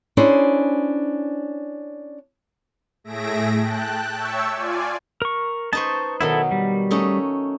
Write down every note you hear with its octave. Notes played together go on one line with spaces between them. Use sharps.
C#4 D4 E4 G#4 C5
A2 A3 G#4 E5 A#6 D7
G5 A5 F#6
C#5 E5 G5 A5 C#6 E6
F4 D5 G#5
A#4 C#6
D#4 B4 C5 A5 C#6
B2 D#3 F#3 E4 A4
G3
A3 C#4 D#4